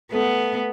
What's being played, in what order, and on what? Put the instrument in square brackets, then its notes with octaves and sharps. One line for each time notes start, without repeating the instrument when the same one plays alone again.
[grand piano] A3 [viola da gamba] B3